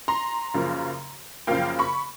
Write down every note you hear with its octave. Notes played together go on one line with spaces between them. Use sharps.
A#5 C6
F#2 C#3 F3 A#3
F#2 C#3 F3 A#3 F5 G5
B5 C#6